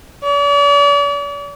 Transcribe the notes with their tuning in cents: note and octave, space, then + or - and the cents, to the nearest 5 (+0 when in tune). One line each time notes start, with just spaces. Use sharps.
D5 -45